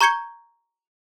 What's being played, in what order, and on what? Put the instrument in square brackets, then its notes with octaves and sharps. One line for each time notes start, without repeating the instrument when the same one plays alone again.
[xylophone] A#5 C#6 G6 G#6 C#7 G7